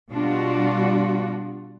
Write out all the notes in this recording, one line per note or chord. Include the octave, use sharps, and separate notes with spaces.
B2 G3 D4 F4 F#4